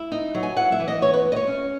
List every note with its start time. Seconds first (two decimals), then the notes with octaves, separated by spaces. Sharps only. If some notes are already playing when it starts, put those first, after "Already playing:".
Already playing: E4 E5
0.12 D#4
0.35 F#3
0.43 G#5
0.56 E4 F#5
0.72 E5
0.80 E3
0.88 D#5
1.02 B3 C#5
1.13 B4
1.25 E4
1.32 D#5
1.36 C#5
1.47 C#4